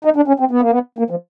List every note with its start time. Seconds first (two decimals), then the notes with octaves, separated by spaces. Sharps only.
0.05 D#4
0.16 D4
0.28 C#4
0.40 C4
0.51 B3
0.61 A#3
0.71 B3
0.99 A#3
1.10 F3